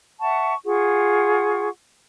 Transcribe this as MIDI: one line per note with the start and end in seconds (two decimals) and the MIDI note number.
0.21 0.54 76
0.21 0.54 78
0.21 0.54 81
0.21 0.54 85
0.65 1.68 65
0.65 1.68 68
0.65 1.68 78
0.65 1.68 85